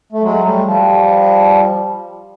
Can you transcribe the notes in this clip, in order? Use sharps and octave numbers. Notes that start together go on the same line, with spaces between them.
A3
F#3 G#3
G3 A3
F3 G3